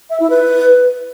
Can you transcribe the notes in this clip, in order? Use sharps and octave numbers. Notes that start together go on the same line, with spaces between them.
E5
E4
B4